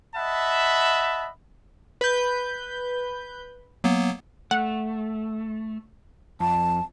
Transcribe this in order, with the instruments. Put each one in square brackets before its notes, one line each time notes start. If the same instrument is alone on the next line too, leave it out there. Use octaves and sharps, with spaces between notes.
[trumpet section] D#5 E5 F#5 A5 B5
[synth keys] B4 G6
[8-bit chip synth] F#3 A#3 B3
[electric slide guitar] A3 [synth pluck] F#5
[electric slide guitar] F2 [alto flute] A5